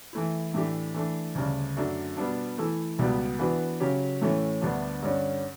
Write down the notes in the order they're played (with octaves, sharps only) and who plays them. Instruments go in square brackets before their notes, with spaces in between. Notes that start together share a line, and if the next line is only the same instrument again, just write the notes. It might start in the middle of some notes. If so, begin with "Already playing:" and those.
[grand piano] E3 A3 E4
A2 E3 A3 D4 G4
E3 A3 D4
D2 C#3 G3
F#2 D3 A3 D4
B2 G3 B3 D4
E3 A3 E4 A4
C#2 B2 G3 B3
E3 B3 D4 F#4 B4
C#3 F#3 C#4 G4
A2 E3 A3 C#4
D2 D3 G3 B3 D4
G2 D3 G3 C#4